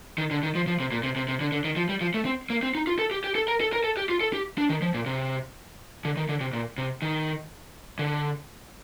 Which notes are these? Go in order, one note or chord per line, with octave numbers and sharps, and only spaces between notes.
D#3
D3
D#3
F3
F3
C3
A#2
C3
C3
C3
D3
D3
D#3
F3
G3
F3
A3
C4
A#3
C4
D#4
F4
A4
G4
G4
A4
A#4
A4
A#4
A4
G4
F4
A4
G4
D4
D#3
F3
A#2
C3
D3
D#3
D3
C3
A#2
C3
D#3
D3